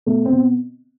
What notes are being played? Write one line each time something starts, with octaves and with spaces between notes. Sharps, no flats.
B2 A3
C4
B2